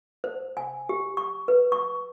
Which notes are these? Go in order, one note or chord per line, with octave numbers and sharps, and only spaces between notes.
C5
G#5
G4
C#6
B4
C#6